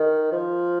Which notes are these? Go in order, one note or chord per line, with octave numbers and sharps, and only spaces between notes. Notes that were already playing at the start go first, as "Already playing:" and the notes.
Already playing: D#3
F3